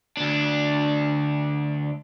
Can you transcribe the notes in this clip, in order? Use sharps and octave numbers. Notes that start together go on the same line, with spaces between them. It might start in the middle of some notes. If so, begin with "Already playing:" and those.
D2 D4